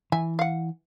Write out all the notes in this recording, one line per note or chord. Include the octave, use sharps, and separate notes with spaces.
E3 E5 G#5
F5 F#5